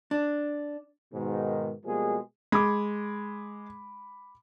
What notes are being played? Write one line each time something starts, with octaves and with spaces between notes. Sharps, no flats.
D4
G#2 B2 D#3
B2 F3 G3 G#3 A#3 G#4
G#3 B5 D6